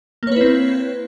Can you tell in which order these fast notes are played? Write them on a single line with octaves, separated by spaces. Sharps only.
A#3 C#5 B4 E4 C4